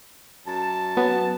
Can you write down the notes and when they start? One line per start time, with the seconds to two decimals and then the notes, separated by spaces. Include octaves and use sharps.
0.46 F#2 A5
0.97 F#3 B3